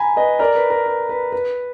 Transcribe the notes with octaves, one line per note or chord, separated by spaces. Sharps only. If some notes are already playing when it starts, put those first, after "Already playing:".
Already playing: G#5 A#5 B5
B4 D#5
A#4 D5
B4
A#4
B4
B4
B4